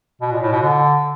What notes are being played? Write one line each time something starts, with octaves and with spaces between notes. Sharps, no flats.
B2
A#2
A2
B2
D3